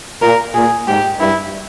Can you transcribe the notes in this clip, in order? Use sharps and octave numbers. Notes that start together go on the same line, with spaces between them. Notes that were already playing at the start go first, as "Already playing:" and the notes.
A#2 A#4
A#2 G#4
G#2 G4
G2 E4